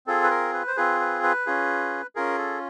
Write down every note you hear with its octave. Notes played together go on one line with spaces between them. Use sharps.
C4 F4 G#4 A4
B4
A#4
B4
C5
C4 F4 G#4 B4
B4
B4
C#4 F4 G#4
C#4 F4 G#4 A#4
A4